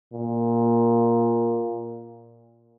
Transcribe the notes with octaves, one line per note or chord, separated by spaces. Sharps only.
A#2